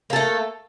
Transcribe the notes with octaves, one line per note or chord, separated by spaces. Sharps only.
A3 A#3 A4